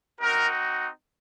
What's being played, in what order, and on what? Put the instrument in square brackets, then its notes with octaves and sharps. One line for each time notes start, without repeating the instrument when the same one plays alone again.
[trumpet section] C4 D#4 F#4 A#4